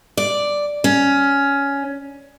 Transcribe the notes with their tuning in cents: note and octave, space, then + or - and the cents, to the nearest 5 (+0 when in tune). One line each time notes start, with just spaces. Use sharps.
D5 +0
C#4 +10